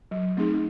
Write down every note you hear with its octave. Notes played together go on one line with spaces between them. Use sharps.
F#3
A3 C4 D#4 G#4